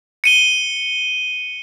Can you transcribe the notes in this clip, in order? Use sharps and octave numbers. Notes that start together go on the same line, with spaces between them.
C#7 D#7 G7